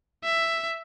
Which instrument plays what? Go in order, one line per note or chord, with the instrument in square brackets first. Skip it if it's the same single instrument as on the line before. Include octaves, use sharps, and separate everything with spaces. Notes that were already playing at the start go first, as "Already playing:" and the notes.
[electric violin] E5